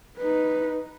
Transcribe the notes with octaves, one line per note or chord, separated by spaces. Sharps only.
D#4 B4